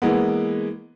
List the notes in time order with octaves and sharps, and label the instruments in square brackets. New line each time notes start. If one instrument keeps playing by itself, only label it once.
[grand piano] E3 G#3 A#3 B3